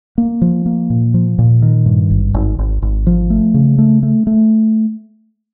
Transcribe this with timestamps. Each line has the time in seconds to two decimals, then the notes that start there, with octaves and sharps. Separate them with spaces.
0.18 A#3
0.42 F3
0.66 A#3
0.90 A#2
1.14 F3
1.39 A#2
1.62 D#3
1.86 G2
2.10 G#1
2.34 G#1
2.58 G#1
2.82 G#1
3.07 F3
3.30 A3
3.54 C#3
3.78 A3
4.03 A3
4.27 A3